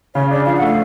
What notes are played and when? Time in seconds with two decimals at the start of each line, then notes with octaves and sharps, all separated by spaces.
0.15 C#3 C#5
0.31 D4 D5
0.46 F3 F5
0.56 F#5
0.61 A3
0.67 F5